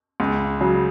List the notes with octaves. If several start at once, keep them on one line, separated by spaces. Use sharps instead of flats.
C#2
C#3 F#3